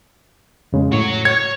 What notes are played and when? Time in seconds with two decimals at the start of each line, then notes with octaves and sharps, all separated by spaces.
0.73 F2 C#3 G#3
0.92 A2 F#4 C#5
1.25 C#5 G#6